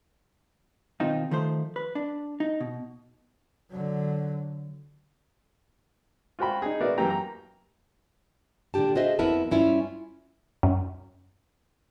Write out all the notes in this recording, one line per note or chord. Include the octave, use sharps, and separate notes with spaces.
B2 D#3 C4 D#4 F4
D#3 F3 A3 C5
B4
D4
D#4
B2
D3 F#3
F4 F#4 C5 G5 B5
D#4 G#4
B3 F#4 A#4 D5 E5
F#2 E3 A#3 G4 A#5
A#5
A#2 D3 D4 G4 A5
F4 F#4 G#4 C5 D#5 E5
F2 B3 E4 A#4 B4 A5
G2 C#4 E4 F4 E5
F#2